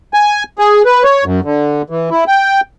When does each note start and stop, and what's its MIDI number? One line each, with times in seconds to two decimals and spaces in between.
0.14 0.43 80
0.59 0.82 68
0.85 1.03 71
1.04 1.24 73
1.24 1.41 42
1.44 1.82 50
1.90 2.10 52
2.10 2.24 64
2.28 2.61 79